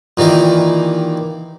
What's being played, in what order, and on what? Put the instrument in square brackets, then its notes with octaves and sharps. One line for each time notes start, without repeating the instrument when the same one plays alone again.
[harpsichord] A#2 D#3 E3 G4